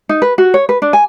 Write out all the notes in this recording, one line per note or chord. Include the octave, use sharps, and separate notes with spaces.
D#4
B4
F#4
C#5
B4
D4
G#5